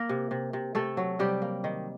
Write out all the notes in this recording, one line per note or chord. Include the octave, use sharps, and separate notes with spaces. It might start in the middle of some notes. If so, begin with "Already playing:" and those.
Already playing: A#3 A#4
C3
C3
C3
C3 A3 A4
F#3
C3 G3 G4
A#3
D#3